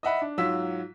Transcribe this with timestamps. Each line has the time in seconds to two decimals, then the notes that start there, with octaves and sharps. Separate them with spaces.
0.03 D#5 E5 F#5 B5
0.22 D4
0.37 G#2 F#3 F4 E6 B6